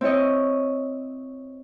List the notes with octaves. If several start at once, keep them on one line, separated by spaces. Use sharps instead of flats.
C4 E4 C#5 D#5